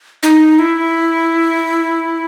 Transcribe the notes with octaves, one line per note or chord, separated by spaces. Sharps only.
D#4
E4